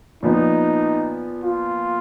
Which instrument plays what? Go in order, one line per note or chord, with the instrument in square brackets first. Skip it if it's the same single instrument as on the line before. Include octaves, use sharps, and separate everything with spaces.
[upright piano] A#2 F3 B3 [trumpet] D#4
[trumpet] F4